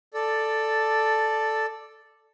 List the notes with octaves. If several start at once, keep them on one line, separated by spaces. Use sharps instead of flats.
A4 D5